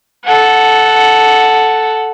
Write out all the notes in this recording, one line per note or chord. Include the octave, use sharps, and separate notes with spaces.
A4 F#5